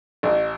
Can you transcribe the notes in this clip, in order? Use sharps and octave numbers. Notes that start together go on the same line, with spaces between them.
A1